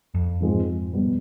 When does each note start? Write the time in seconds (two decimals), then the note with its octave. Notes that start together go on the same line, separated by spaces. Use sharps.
0.14 F2
0.40 G#2 F3 G#3 C4
0.93 B2 G3